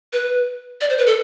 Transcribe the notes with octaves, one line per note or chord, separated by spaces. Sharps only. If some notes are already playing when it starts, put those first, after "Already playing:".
B4
D5
C5
B4
A4